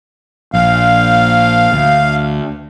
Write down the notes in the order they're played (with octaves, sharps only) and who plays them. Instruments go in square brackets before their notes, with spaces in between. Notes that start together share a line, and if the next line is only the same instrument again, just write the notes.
[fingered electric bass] A#1 [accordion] F5
[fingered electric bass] D2